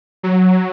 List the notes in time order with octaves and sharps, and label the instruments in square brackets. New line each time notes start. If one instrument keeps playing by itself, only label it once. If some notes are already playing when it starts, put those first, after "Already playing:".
[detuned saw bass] F#3